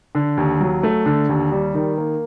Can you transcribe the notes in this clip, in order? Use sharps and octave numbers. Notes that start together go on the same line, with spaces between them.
D3
D#2
F#3
A3
D3
D#2
G3
D#3
A#3